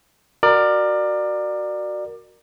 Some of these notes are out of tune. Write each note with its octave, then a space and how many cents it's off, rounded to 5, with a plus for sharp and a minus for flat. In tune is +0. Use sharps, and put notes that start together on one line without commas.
F#4 +0 A#4 +0 D5 +25